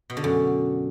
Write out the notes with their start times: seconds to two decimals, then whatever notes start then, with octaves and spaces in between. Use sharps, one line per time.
0.10 B2
0.17 D3
0.24 F#2